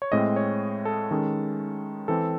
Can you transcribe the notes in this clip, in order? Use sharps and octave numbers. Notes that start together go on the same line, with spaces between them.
C#5
A2 G#3 C4 D#5
C#5
A4
D#3 G#3 C#4
E3 C4 A4